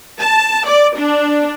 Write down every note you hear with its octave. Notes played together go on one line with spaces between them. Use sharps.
A5
D5
D4